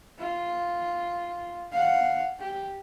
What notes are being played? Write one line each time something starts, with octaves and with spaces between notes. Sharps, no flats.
F4
F5 F#5
G4